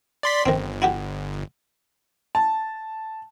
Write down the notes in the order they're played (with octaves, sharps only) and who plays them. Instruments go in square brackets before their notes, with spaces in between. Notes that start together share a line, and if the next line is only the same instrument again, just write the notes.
[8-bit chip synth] D5 C6 B6
[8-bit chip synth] G1 [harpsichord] D#3 C4
[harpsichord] E4 F#4 G4
[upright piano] A5